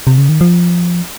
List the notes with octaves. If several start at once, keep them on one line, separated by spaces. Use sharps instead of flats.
C3
C#3
D#3
F3